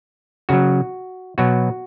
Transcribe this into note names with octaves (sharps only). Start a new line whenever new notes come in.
C#3 F#3 F#4
B2 F#3 F#4